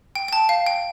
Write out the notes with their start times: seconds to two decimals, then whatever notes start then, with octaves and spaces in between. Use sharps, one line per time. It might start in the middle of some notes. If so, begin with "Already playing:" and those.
0.15 G5
0.28 G5
0.33 A5
0.49 F5
0.66 G5